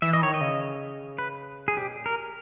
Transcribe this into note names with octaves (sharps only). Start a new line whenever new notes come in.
E3 E5
D#5
D#3 C#5
D#5
C#3
B4
G#4
B2 G4
A#2
A#4